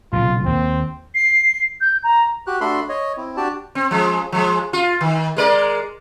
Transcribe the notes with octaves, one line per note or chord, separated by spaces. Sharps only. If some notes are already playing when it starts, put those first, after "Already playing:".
B1 A#2 C#3 F4
D#2 A#3 C4
C7
G6
A#5
F#4 G4 F#6
A3 D4 F#4 A4 B5 C6
C#5 D#5
C4 E4
D4 F#4 G4 D5 A5
C4
F3 G#3
F3 G#3
F4
D#3
G#3 A#4 D5